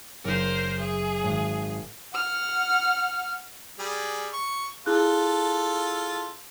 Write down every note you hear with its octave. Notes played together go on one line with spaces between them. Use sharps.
F#1 A#4 C5 D6
G#4 E5 D7
G#1
F#5 F6
G3 G#4
C#6
E4 F4 G#4 A4 F#6